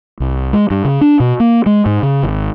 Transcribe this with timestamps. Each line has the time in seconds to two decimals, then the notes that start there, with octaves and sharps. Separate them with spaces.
0.20 C2
0.53 G#3
0.70 G2
0.85 C#3
1.01 D4
1.20 B2
1.40 A#3
1.66 G#3
1.86 G#2
2.03 C#3
2.23 G#1